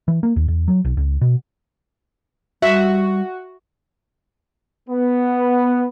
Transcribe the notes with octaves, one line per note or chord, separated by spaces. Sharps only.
E3
A#3
D#2
E2
F#3
B1
C#2
B2
G3 F#4 E5
B3